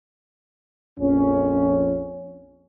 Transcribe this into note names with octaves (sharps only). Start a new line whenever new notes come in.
A#1 F2 C#4